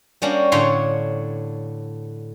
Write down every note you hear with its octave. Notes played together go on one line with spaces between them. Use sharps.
G3 A#3 C#4 D4 F#4
A2 D3 D4 C#5 F5 C6